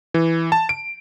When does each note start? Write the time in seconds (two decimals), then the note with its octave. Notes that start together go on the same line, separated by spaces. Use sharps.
0.14 E3
0.52 A5
0.69 D7